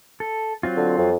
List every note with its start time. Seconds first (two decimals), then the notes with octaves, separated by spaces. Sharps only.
0.20 A4
0.63 F#3 C4 F4
0.77 D3
0.98 F2